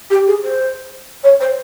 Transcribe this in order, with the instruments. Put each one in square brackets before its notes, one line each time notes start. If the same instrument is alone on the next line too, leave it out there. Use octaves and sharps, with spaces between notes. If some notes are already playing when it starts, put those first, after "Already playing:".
[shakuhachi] G4
G#4
C5
C#5
C5